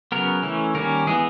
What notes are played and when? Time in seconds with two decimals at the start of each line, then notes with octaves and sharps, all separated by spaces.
0.12 C#3 F#3 B3 A#4
0.43 E3 A3 C#4
0.75 D#3 G3 A#3 C#4 A#4
1.07 E3 G#3 B3 G#4